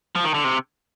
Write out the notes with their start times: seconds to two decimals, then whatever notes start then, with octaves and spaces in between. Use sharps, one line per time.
0.15 F3
0.24 D#3
0.34 D3
0.44 C3